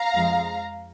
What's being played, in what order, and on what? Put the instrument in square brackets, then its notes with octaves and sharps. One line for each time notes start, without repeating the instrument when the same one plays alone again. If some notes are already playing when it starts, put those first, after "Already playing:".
Already playing: [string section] F5 A#5
F2 F3 G#3